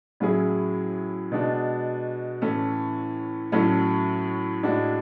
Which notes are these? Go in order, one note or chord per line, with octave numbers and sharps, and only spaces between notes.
A2 F#3 C#4 E4 G#4
B2 G#3 D4 F#4
A2 E3 A3 C#4
A2 F#3 A3 C#4
A2 G#3 D4 F#4